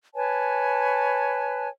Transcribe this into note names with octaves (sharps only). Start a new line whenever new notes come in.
B4 C#5 G#5 A5